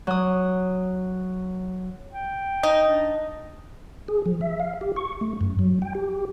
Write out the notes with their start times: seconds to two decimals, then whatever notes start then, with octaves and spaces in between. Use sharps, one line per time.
0.07 F#3 D#6
2.12 G5
2.63 D#4 D#5
2.87 D4
4.08 G#4
4.26 F3
4.41 E5
4.60 F5
4.81 G4
4.96 C#6
5.21 A3
5.41 F#2
5.59 F#3
5.82 G5
5.95 G4